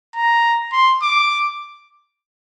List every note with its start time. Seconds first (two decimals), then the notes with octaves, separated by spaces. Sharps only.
0.15 A#5
0.72 C6
1.02 D6